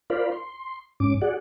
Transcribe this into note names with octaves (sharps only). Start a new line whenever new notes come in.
F4 A#4 C5 D5 F5 B5
C6
G#2 C#4 D6
F#4 G#4 D5 F#5